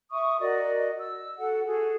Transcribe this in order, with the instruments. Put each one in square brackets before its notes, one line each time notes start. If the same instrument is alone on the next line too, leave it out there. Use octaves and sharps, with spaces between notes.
[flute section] E5 C#6 D#6
F#4 A#4 D5 D#5
E6
F#4 A4 F#5
F#4 G#4 A4